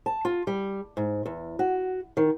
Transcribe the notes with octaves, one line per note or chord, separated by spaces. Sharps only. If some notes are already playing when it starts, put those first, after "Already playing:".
A5
F4
G3
G#2
E2
F#4
D#3